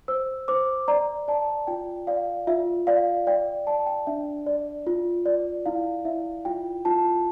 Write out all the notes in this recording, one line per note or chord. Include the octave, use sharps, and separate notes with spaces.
C5 E6
C5 D6
D5 A#5
D5 A5
F4 G5
D5 F5
F4 E5
D5 F5
D5 G5
D5 A5
G5
D4 E5
D5
F4
D5
E4 F5
E4 E5
F4 G5
F4 A5